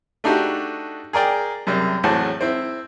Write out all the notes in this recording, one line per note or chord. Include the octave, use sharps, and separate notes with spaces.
A3 D4 D#4 F#4 G4
G#4 A#4 D5 G5
F#2 C3 G3
E2 A2 F#3 C4 F#5 A5
C4 E4